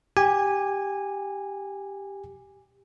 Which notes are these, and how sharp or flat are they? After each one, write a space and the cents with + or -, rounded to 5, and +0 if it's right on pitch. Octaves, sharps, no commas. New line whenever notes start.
G4 +5 G#5 -15